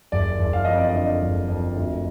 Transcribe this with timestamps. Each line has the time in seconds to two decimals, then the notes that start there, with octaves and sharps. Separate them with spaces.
0.12 F#1 D5
0.39 F#1
0.53 F5
0.65 F2 D#5
0.76 D5
0.89 D#5
0.94 D3
1.22 F#1
1.48 F2
1.75 D2